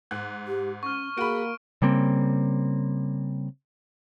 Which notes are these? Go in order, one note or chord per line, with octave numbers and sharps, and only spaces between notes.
G#2 F#6
G4
C#4 C#6 F6
A#3 F#4 G#4 B5 D7
C#3 G3 A#3 C4